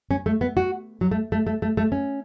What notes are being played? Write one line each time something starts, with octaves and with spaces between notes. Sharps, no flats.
C#4
A3
B3
F#4
F#3
A3
A3
A3
A3
A3
C#4